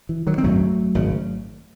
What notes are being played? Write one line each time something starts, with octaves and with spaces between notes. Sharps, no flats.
E3
D#3 F#3
C4
G#1 F#2 C#3 F#3 A3
G#1 F#2 C#3